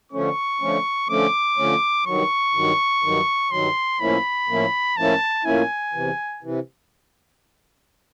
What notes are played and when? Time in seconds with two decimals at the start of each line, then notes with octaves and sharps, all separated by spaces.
0.12 D3 F3 A3 C#4 C#6
0.61 D3 F3 A3 C#4
1.09 D3 F3 A3 C#4 D6
1.57 D3 F3 A3 C#4
2.05 G2 D#3 F#3 C#6
2.54 G2 D#3 F#3
3.03 G2 D#3 F#3
3.51 G2 D#3 F#3 C6
4.00 A2 F3 A#3 C#4 E4 B5
4.48 A2 F3 A#3 C#4 E4
4.97 A2 F3 A#3 C#4 E4 A5
5.45 A2 F3 A#3 C#4 E4 G#5
5.93 E2 C3 E3
6.43 C3 E3